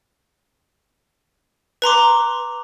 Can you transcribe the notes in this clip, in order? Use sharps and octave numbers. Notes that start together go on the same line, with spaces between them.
B4 A#5 C6 D6